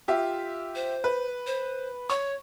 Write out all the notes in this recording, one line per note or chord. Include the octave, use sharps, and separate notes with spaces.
F4 G4 E5
C5
B4
C5
C#5 C#6